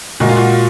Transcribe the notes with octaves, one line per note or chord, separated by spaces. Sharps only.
A#2 G#3 F#4
F4
F#4